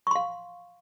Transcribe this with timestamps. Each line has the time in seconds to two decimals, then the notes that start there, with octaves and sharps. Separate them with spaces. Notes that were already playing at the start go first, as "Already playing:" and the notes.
0.07 C#6
0.11 C6
0.16 F5